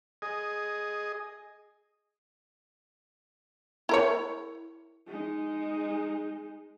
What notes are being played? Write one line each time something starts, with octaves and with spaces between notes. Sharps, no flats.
G#4 D#5
E4 A#4 C#5
G#3 D#4